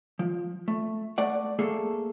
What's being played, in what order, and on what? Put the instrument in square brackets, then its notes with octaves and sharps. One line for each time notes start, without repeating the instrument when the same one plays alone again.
[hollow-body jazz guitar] F3
A3
A3 D5 F#5
A3 A#3 G#4 A4